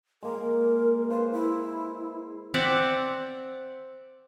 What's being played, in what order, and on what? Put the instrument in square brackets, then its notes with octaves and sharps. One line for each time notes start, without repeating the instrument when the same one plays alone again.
[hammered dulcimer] G#3 A#3 [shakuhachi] A#4
[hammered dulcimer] B4 C5 [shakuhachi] F5
[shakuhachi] E4
[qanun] C4 D5 E5 F#5